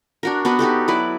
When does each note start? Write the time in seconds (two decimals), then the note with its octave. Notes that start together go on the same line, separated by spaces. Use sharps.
0.23 D4 F#4 A#4
0.45 B3 D4 F#4 B4
0.59 D#4 F#4 G4 A4
0.88 F#3 E4 B4 D5